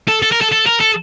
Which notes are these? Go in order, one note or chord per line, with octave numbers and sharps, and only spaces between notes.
A4
A4
A#4
A4
A4
A#4
A4